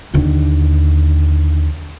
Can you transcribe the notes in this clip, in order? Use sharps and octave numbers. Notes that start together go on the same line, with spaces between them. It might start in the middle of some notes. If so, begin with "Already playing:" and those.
D#2 D3